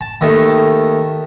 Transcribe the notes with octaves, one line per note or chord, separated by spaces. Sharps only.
A5
D#2 D#3 A3